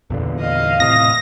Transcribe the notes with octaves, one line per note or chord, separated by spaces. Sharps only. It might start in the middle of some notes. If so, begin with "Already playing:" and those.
E2 A#2 D3
D#5 F5
A2 C3 D#6 A#6